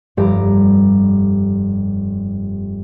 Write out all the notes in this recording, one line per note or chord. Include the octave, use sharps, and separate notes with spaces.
F1 G2 G4 A#5